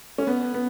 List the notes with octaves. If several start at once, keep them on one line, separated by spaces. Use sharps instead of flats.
C#4
B3
B3